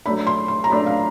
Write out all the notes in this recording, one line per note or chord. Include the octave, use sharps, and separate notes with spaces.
F#3 A3 D4 B5
C6
C6
A#5
F#3 A3 D4 B5
F5